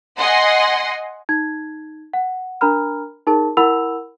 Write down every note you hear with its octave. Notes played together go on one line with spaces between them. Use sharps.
D#5 F#5 G#5 C6
D#4 G#6
F#5
D4 A#4 A#5 B5 F6
D#4 G#4 A#4 A5
E4 A#4 F#5 B5 E6 F7